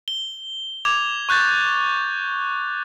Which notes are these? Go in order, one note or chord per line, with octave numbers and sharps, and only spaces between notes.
G7
D6 G#6 F7
C#6 F#6 G6 A6